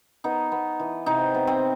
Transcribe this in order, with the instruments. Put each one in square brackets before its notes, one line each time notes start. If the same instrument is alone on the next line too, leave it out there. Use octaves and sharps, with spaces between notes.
[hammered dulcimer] B3 D#4
B3
E3
C3 D#4
B3
C4